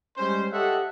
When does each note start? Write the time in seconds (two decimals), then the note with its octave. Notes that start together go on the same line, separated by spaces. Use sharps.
0.17 G3 G#3 C#4 C5
0.52 G4 A4 C#5 D#5 E5 F#5